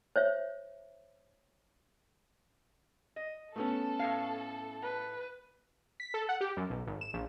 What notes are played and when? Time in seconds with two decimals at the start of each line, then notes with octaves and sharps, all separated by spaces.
0.16 C5 C#5 E5
3.16 D#5
3.56 A3 B3 C#4 A4
3.99 A2 C#5 F5
4.82 B4
6.00 B6
6.14 A4
6.29 F#5
6.41 G4
6.57 F#2
6.70 B1
6.87 G#1
7.01 E7
7.13 A#1